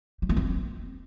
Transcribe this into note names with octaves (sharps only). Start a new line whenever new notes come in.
G3
A3
C4